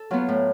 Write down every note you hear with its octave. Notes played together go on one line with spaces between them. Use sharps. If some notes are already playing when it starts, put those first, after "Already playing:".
Already playing: A4
F#3 B3 F4
A2